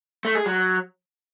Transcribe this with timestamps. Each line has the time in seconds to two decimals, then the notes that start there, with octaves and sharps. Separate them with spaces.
0.25 A3
0.35 G#4
0.46 F#3